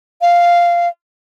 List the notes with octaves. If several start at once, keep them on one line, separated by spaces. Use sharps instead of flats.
F5